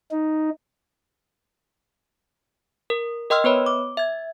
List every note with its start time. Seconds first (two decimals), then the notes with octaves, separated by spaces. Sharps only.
0.11 D#4
2.90 A#4
3.30 A#4 D#5 G5 C6 E6 F6
3.44 B3 B4 C#5 B5
3.66 D6
3.97 E5 G#6